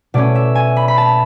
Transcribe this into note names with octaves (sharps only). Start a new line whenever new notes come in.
B2 A3 C#4 D5
E5
G#5
B5
B5
A5